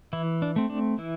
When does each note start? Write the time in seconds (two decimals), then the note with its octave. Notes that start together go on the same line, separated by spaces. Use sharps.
0.13 E3 E4
0.42 D4
0.56 A3 C4
0.70 D4
0.98 E3 E4